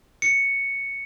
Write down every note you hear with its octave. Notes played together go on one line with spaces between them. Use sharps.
C#7